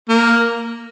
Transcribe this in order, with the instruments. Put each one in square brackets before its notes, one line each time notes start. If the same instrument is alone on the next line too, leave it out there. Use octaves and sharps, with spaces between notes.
[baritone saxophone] A#3